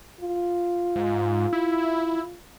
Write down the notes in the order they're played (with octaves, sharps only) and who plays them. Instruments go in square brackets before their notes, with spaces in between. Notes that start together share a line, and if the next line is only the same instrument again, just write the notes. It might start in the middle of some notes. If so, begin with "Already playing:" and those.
[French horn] F4
[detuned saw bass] G#2
E4